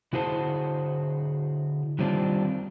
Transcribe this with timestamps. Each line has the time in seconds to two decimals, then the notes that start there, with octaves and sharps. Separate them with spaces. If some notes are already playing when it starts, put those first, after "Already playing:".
0.13 D3 E4 F#4 G#4 C5 A5
1.99 D#3 G3 A3 C4 D4 F4